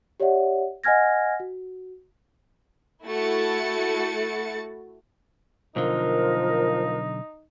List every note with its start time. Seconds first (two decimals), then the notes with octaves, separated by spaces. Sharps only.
0.20 G4 C#5 D5 E5 F#5
0.84 D#5 F#5 G#5 F6 G#6 A#6
1.40 F#4
3.06 A3 E4 F#4 A6 C#7
5.76 B1 D3 F3 D#4 A#4